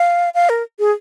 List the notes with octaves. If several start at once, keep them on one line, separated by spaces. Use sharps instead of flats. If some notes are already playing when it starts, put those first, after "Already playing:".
Already playing: F5
F5
A#4
G#4